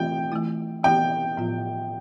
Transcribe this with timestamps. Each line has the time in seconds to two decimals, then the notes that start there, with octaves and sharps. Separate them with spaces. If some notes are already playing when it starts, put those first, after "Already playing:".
Already playing: E3 A3 C4 F4 G5
0.32 E3 A3 E4
0.84 E3 B3 E4 G4 G5
1.37 A2 F3 B3 F4